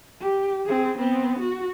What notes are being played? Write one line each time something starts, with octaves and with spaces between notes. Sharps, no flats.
G4
C4 G#4
B3 C4
F#4